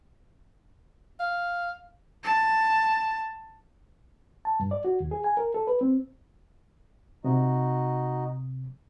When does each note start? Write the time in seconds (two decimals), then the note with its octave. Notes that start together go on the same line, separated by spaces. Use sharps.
1.20 F5
2.24 A5
4.45 A5
4.60 G2
4.71 D5
4.85 F#4
5.00 D#2
5.11 G#4
5.24 G#5
5.37 A#4
5.54 A4
5.67 B4
5.81 C4
7.24 C3 D#4 F#4 D#5